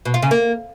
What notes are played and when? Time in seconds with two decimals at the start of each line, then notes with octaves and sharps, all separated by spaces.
0.05 B2
0.14 F4
0.23 C#3
0.31 A#3